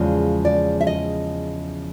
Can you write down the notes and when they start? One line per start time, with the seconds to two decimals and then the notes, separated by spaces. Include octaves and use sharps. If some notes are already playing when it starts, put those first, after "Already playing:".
Already playing: E2 C#3 F3 G#3 D5
0.45 D5
0.81 E5
0.87 D#5